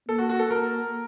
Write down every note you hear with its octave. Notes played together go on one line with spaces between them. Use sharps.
A#3 A4
F#4
F#4
A4
A#4